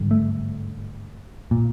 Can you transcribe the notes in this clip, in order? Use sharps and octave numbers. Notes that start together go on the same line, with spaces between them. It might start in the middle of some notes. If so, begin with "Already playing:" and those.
Already playing: G#1 G2 D3
A3
A#2